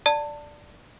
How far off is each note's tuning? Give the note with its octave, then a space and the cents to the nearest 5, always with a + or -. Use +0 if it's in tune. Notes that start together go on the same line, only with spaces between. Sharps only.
D5 +0 A5 +20